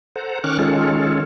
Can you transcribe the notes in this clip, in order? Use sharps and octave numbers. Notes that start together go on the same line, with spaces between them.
A4 C5 F#5 A#5
D#3 C#4 C#6 D6 F6 F#6
D#3 G#3 C#4 F4 A4